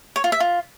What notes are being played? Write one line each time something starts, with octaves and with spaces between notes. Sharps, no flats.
C#5
F4
E5
F4